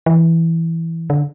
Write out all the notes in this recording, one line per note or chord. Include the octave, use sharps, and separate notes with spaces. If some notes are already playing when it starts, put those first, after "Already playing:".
E3
D3